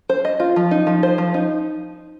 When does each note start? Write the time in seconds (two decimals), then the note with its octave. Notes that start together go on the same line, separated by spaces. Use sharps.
0.10 C5
0.25 D#5
0.40 F4
0.56 F3
0.71 D#4
0.87 F3
1.03 C5
1.18 F3
1.34 D#4